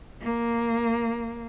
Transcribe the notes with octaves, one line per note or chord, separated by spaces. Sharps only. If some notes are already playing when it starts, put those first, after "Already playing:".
A#3